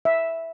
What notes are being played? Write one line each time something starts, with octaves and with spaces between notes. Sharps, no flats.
E5